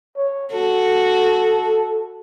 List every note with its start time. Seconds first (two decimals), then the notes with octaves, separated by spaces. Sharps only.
0.17 C#5
0.53 F#4 A4